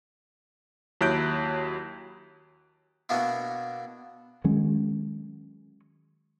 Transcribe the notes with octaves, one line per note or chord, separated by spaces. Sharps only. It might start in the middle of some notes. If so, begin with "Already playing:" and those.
D#2 F#3 E4 F#6 G6 D7
B2 A#3 B3 D4 E4
D#3 F#3 G#3 C#4